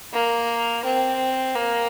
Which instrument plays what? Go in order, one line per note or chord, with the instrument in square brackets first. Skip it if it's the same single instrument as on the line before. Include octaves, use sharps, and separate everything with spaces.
[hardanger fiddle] A#3
C4
A#3